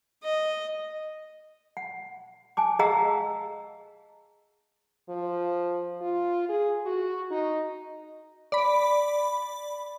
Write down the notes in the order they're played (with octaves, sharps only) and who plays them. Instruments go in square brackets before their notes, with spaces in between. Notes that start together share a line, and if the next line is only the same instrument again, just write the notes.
[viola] D#5
[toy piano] F#5
G#5 A5 D6
G#4 D#5 F5 F#5 A#5 E6
[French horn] F3
F4
G#4
F#4
D#4
[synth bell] D5 B5